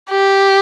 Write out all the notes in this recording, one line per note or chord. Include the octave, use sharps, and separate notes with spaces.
G4